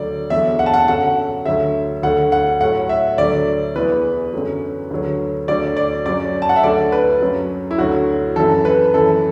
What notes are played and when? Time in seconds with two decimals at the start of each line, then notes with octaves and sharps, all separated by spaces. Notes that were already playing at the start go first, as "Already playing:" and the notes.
Already playing: D2 D3 F#3 D5
0.30 E2 D3 F#3 E5
0.59 F#5
0.66 A5
0.74 F#5
0.88 F#2 D3 F#3 F#5
1.45 D2 D3 F#3 E5
2.03 D2 D3 F#3 F#5
2.32 F#5
2.61 A2 F#3 F#5
2.89 E5
3.18 D2 D3 F#3 D5
3.76 E2 E3 B4
4.33 F#2 D3 F#3
4.91 D2 D3 F#3
5.48 D2 D3 F#3 D5
5.77 D5
6.06 F#2 F#3 D5
6.42 A5
6.49 F#5
6.56 E5
6.64 D2 D3 F#3 D5
6.92 B4
7.21 F#2 F#3
7.71 E4
7.78 D2 D3 F#3 F#4
8.36 F#2 E3 A4
8.65 B4
8.94 F#2 E3 A4